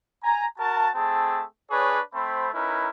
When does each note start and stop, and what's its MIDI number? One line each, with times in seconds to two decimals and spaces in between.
0.24 0.46 80
0.24 0.46 82
0.59 0.89 66
0.59 0.89 70
0.59 0.89 81
0.95 1.44 57
0.95 1.44 60
0.95 1.44 68
0.95 1.44 81
1.71 2.00 62
1.71 2.00 68
1.71 2.00 71
1.71 2.00 73
2.14 2.48 57
2.14 2.48 60
2.14 2.48 72
2.14 2.48 83
2.54 2.88 61
2.54 2.88 63
2.54 2.88 64
2.54 2.88 70
2.54 2.88 71